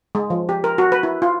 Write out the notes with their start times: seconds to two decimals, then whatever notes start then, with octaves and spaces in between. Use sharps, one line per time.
0.15 G#3
0.30 F3
0.49 G4
0.64 A#4
0.78 F#4
0.92 B4
1.03 E4
1.22 F4